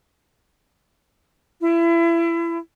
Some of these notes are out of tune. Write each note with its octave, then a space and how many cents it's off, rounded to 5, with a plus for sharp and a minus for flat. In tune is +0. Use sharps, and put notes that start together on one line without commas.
E4 +30